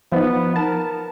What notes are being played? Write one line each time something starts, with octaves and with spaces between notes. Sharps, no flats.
F3 B3 D#4
A#4 A5